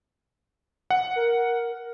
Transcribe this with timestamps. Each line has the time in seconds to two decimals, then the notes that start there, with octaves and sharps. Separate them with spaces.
0.90 F#5
1.16 A#4